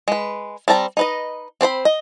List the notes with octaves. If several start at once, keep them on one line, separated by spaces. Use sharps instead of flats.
G#3 B4
G3 C4 A5 A#5
D#4 B4 D#5
C4 D4 C5 B5
D#5